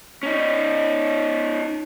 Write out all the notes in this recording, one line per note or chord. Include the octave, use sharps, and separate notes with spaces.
C#4 D#4